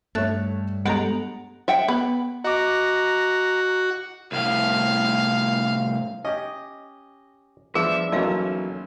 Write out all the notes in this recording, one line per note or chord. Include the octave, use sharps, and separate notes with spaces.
G2 A3 C#5 E5 F#6 A6
G#3 B3 G4 A4 F#5 A#5
E5 F#5 G5
B3 B5
F#4 D#5 A#5 D6
C2 A2 F5
C#4 G4 D#5
F3 B3 D4 G#4 E5 F5
B1 E3 F#3 A#3 C#4 A4 D#5 F5